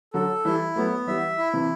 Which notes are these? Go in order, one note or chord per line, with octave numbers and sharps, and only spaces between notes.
D3 F#3 A4
E3 G3 E4
F#3 A3 B3
E3 G3 E5
E4
C3 E3